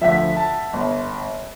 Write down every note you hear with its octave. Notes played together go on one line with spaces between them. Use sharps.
D2 F3 E5 F#5 B6
A5
G1